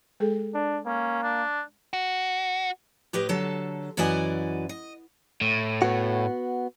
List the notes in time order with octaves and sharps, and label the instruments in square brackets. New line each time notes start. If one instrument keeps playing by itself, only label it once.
[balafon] G#3 G#4 A4
[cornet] D4
[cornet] A#3 [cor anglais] C#4
[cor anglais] D4
[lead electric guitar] F#4
[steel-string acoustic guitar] A2 G4 B4 D#5
D3 F#3 A4 A5
F#2 E3 F#4 D5 D#5 G#5
D#5
[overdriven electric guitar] A2
[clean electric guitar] B3 F#4